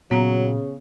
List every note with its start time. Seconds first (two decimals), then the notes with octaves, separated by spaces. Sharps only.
0.11 A#2 C#3 F#3 B3 A#5